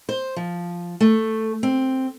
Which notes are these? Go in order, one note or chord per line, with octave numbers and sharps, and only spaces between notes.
C5
F3
A3
C4